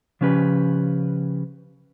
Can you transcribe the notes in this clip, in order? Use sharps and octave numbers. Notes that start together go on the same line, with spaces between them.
C#3 F3 C#4 G4 B4